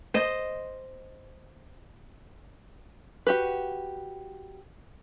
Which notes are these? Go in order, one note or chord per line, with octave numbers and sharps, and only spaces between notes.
C5 D#5
F#4 G4 B4